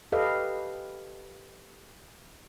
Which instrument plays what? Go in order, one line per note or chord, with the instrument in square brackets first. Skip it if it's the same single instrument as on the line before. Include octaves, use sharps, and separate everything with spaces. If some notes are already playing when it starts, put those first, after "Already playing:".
[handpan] G4 A4 B4 D#5 F5